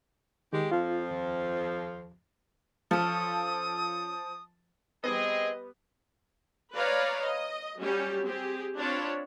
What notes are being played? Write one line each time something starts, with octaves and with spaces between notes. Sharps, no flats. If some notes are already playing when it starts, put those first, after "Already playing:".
D#3 G#3 G4
F2 F3 F4
D#2
F3 C#4 A4 D#6
G3 B3 C4 G#4 D#5
B4 C#5 D5 F5 A#5
D#5
F#3 G3 C#4 F#4 G4
C4 G4 G#4
C4 D4 F4 C#5 B5